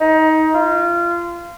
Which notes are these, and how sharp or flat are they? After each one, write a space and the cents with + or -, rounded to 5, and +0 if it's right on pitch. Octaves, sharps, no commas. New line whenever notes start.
D#4 +20
F4 -25